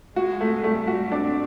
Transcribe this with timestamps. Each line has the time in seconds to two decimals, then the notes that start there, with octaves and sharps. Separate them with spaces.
0.16 G#3 F#4
0.41 A3
0.64 G3 A3
0.87 F#4
1.11 C4 D4